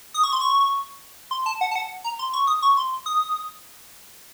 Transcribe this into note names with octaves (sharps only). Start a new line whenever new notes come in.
D#6
C#6
C6
C#6
C6
A5
F#5
A5
F#5
A#5
C6
C#6
D#6
C#6
C6
D#6